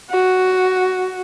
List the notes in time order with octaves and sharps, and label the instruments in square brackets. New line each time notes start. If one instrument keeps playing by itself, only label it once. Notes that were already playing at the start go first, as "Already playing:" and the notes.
[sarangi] F#4